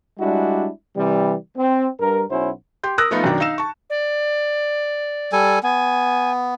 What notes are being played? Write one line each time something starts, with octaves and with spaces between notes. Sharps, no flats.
G3 G#3 D4 E4 F#4
C3 E3 G3
C4
G2 A#4
B1 C#4 E4 F#4 C5
G4 C6 G6
A#4 D#6 E6 F#6 A#6
F3 A3 B3 D#4 F4
F#2 B2 D#3 D4
D#4 F5 E6 E7
A5 C#6
D5
G3 A4 G#5
B3 G#5